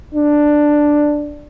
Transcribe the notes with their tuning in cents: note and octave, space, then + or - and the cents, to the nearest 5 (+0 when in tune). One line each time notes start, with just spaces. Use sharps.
D4 +5